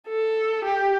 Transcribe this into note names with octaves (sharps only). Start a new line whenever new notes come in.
A4
G4